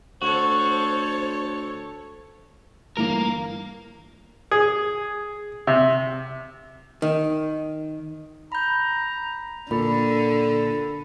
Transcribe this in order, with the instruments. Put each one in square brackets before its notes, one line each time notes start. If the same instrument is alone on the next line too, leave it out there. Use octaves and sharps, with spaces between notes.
[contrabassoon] D2 [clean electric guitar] F#4 [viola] A4 C#5 [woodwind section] C5
[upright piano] G1 E3 [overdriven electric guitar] A#3 A#4
[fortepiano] G#4
C3
[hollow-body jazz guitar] D#3
[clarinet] A#5 [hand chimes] B5 G6
[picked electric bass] A#2 [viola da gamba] D3 [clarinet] A4 [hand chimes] B5